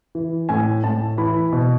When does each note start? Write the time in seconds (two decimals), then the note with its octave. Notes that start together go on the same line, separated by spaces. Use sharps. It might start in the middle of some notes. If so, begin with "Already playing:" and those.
0.15 E3
0.49 A2 G#5
0.84 A2 A5
1.18 E3 B5
1.53 B2